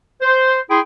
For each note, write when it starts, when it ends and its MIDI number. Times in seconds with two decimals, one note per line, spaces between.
0.21 0.60 72
0.70 0.80 64
0.70 0.80 68
0.70 0.80 79
0.70 0.80 84